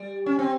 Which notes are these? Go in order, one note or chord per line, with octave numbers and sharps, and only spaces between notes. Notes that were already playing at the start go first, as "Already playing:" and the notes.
Already playing: G3
C#4
C4